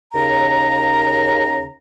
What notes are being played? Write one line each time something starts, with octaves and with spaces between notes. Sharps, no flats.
D#2 C#3 A#5